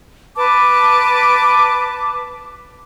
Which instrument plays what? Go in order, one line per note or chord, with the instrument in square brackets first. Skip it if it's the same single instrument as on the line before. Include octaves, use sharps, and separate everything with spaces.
[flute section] B4 A5 D6